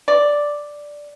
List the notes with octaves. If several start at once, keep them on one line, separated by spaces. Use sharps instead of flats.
D5